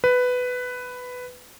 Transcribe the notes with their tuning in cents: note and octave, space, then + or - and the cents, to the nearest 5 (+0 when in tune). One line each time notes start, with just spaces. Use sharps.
B4 +10